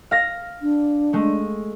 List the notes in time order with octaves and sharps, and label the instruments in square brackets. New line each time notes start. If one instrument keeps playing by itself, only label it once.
[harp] F5 A#6
[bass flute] D4
[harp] G#3 A3